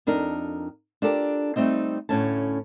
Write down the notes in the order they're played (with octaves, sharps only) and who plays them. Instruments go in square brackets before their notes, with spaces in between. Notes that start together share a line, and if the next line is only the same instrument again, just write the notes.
[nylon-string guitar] F2 D4 D#4 A#4
D4 F4 G4 A4 A#4 D5
G3 A3 C4 D#4
D2 A2 C#4 A5